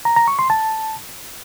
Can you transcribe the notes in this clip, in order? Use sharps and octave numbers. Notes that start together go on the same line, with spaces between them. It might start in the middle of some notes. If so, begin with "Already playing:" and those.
A#5
A#5
C#6
C6
A5